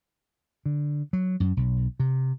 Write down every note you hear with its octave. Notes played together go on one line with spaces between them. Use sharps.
D3
F#3
F#2
B1
C3